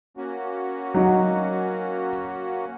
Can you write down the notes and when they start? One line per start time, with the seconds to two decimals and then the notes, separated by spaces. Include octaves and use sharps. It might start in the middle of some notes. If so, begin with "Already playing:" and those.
0.17 A#3 C#4 F#4
0.94 F#3 D#4